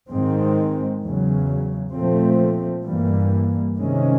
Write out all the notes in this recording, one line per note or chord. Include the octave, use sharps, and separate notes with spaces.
G#2 D#3 G#3 C4
E2 C#3 F#3
A#2 F3 A3 C4
G2 E3 G3 A#3
C3 D#3 G#3 C#4